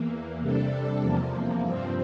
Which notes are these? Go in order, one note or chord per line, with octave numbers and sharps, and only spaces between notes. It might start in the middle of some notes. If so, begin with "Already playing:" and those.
Already playing: E2 E3 A#3
C3 G3 D4 A4
E2 C3 F3 A#3
G2 F3 C4